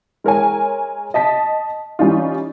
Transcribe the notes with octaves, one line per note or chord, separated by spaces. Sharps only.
G#3 A#4 C#5 G#5
D#5 A5 B6
E3 G3 C#4 D#4 F4